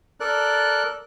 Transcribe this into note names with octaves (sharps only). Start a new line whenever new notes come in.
A4 A#4 D5 F#6